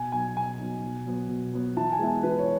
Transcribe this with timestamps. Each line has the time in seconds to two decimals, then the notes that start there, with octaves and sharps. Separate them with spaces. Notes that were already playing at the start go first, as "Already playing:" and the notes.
Already playing: B2 G#5
0.12 F#3 B3 D#4 G#5
0.37 B2 G#5
0.59 F#3 B3 D#4
0.83 B2
1.06 F#3 B3
1.29 B2
1.53 F#3 B3
1.77 E3 A5
1.92 G#5
1.99 G#3 B3 E4
2.07 G#5
2.23 E3 B4
2.39 C#5